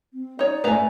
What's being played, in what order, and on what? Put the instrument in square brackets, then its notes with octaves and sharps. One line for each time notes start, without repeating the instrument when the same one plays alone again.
[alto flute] C4
[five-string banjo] D#4 C#5 [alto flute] D5
[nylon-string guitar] A3 G#5 [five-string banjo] B4 C5 A#5